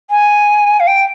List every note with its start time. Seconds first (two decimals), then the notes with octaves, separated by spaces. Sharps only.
0.10 G#5
0.80 F5
0.87 G5